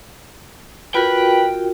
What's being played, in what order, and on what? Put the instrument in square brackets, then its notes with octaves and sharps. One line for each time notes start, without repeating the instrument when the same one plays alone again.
[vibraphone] F4 F#4 A#4 [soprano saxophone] B4 [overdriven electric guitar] G5